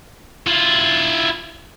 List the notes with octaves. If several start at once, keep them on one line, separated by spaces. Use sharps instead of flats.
E4 F4